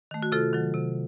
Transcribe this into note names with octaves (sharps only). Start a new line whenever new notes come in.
D#3 A3
F#4
C3 F4 A4
D#3 F#3
C3